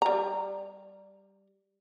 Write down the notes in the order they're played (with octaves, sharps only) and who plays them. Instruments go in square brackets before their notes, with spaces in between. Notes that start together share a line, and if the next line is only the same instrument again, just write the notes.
[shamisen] G3 A#5